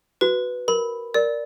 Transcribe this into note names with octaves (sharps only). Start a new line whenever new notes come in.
F#4 B4
A#4 B5
A#4 D5